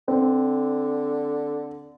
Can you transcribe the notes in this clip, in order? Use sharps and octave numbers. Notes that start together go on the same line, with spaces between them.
D3 C4